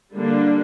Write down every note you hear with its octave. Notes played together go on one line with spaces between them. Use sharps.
D3 G3 A#3 D4